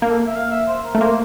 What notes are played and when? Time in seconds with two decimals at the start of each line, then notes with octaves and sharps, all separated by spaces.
0.02 A#3 A#4
0.10 A4
0.26 E5
0.35 F5
0.51 E5
0.68 C5
0.85 A#4
0.95 A3
1.01 A#3 C5